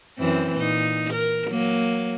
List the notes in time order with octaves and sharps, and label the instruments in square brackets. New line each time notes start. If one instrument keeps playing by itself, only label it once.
[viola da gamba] F#2 E3 C4
A#2 D#4
A#4
F#3 A#3